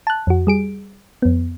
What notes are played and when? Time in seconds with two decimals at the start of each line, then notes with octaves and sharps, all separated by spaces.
0.07 A5 F#6
0.27 F2 F#4
0.47 G3 G#4 D7
1.22 F2 B3